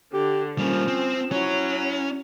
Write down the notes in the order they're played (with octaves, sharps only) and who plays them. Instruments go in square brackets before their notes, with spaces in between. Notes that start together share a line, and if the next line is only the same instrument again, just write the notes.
[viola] D3 [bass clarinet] G4
[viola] F3 [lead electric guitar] G3 A#3 [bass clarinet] C#4
[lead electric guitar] C4
[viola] F#3 [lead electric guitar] C#4 [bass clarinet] E4